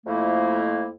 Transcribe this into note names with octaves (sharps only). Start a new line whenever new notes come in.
F2 A3 A#3 E4